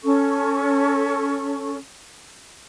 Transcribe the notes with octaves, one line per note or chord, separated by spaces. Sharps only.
C#4 A4 C#6